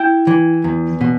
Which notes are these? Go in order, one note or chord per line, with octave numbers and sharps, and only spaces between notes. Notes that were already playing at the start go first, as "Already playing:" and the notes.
Already playing: E4 G5
E3
E2
B2